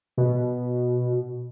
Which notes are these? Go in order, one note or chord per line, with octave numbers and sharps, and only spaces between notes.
B2